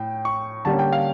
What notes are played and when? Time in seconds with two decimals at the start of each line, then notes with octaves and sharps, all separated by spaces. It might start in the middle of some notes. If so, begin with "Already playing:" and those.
Already playing: A2 G5
0.25 C#6
0.65 D3 G3 A#3 C#4 A5
0.79 G5
0.92 F5